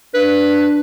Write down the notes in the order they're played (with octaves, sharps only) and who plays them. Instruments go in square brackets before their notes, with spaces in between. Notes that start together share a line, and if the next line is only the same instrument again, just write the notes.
[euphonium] D4 [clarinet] B4